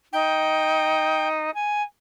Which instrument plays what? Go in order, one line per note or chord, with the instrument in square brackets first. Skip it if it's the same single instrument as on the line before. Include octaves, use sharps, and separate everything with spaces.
[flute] D#4 [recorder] G5
[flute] G#5